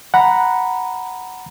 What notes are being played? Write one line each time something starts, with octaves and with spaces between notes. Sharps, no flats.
F#5 A#5 B5